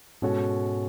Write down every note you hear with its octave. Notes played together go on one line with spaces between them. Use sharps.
G#2 B2 G#3 C#4 F#4 A4